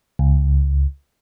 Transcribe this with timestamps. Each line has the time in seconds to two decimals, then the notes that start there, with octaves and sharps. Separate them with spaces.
0.19 C#2